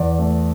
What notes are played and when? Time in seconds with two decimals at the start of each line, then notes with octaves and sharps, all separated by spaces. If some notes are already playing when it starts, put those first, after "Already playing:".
Already playing: E2 D5
0.19 A3